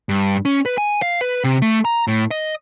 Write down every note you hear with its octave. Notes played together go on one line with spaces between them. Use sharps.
G2
C#4
B4
G#5
F5
B4
C3
A3
A#5
A2
D#5